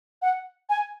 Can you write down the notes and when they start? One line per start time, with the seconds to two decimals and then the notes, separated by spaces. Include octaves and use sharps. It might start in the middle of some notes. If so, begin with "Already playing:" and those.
0.22 F#5
0.69 G#5